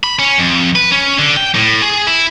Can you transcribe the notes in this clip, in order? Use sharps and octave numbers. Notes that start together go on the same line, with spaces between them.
B5
C#4
F2
B4
C#4
D3
G5
A2
G#4
E4